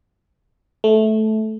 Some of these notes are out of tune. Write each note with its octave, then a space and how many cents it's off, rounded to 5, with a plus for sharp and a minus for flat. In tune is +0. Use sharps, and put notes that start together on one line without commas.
A3 -15